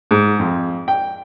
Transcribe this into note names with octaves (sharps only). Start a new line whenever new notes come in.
G#2
F2
G5